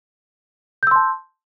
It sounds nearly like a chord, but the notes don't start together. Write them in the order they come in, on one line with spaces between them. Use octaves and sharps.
G6 E6 C6 A5